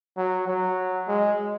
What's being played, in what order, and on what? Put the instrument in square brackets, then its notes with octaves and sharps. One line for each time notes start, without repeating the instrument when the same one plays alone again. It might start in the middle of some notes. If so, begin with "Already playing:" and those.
[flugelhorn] F#3
F#3
G#3